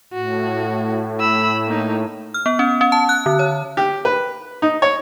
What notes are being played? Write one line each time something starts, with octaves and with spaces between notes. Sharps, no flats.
A2 F#4
B5 E6
A#3 D#4
F6
B3
C#4
C#4
A5
F#6
D3
C#5
G4
B4
D#4
C#5